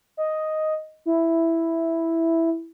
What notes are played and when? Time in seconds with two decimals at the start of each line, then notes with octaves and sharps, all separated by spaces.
0.17 D#5
1.06 E4